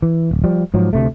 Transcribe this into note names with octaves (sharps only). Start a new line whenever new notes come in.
E3
D1
F3 G3
G#2 F3 F#3
D2 C3 A3